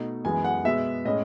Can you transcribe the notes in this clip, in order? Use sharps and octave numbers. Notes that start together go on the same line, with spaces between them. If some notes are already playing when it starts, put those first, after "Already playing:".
Already playing: B2 A3 D#4
F#2 E3 G#3 B3 G#5
F#5
B2 G#3 B3 E5
A2 G#3 C#4 D#5